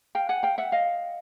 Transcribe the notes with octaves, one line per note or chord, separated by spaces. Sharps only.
F5 G5
F#5 G#5
F5 G5
E5 F#5
D#5 F5